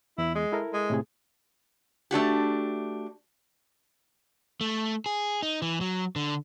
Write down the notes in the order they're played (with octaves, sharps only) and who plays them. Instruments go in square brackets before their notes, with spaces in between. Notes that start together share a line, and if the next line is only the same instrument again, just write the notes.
[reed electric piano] E2 [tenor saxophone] E4
[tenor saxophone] G#3
[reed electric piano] E4 A4 A#4
[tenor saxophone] G#3
[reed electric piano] A2 C3 G#4
[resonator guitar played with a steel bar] A3 D4 F#4 G4
[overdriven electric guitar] A3
G#4
D#4
E3
F#3
D3